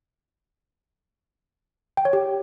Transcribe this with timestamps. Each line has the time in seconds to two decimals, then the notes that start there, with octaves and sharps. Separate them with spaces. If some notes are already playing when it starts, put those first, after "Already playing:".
1.97 G5
2.05 C#5
2.13 G4